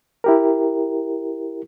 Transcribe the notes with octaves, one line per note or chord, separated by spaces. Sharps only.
E4 G4 A#4